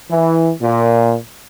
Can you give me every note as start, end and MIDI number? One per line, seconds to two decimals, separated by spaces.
0.11 0.51 52
0.60 1.16 46